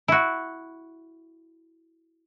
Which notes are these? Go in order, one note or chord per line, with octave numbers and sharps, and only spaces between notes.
E4 F#4